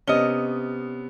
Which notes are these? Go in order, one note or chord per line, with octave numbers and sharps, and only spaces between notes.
C3 B3 C#4 D#5 G7